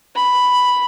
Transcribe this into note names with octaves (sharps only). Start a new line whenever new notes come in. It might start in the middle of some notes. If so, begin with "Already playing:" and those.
B5